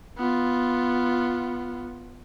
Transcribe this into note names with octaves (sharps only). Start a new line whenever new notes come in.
B3 F4